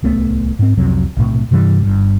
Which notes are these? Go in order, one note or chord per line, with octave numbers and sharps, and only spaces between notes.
D1 C2 A3 B3
G#2 C4
C2 F2 C3 F#3
B1 A2 C3
G2 C3 E3 G3
G1 G2